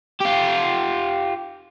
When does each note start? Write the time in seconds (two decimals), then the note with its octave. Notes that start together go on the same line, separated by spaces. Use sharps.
0.21 F4 G4